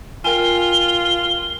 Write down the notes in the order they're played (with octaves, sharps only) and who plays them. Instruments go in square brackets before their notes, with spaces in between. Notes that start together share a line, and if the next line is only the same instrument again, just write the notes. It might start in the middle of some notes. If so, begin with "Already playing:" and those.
[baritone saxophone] F4 [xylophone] A#4 G5 G#5 [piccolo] G7